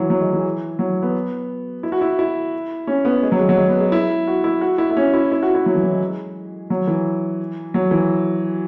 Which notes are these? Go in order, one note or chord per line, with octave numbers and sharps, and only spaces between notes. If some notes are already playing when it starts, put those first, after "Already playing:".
Already playing: E3 F#3
F#3
G#3
E3
F#3
B3
E4
F#4
E4
E4
C#4
B3
G#3
F#3
G#3
F#3
G#3
B3
G#3
E4
F#4
E4
F#4
E4
E4
C#4
E4
E4
F#4
E4
F#3
E3
F#3
G#3
F#3
E3
F#3
E3